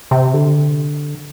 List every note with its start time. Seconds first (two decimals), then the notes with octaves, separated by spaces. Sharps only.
0.11 C3
0.34 D3